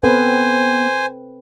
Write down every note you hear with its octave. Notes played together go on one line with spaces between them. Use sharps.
B3 C4 A4 B4 C5 G#5